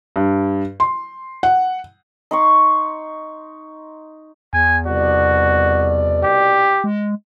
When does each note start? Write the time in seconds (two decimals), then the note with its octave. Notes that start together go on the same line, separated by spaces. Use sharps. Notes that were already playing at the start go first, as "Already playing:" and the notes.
0.16 G2
0.80 C6
1.43 F#5
2.31 D#4 C6 C#6
4.53 E2 G#5
4.86 C2 B2 F#4 D5
6.23 G4
6.84 G#3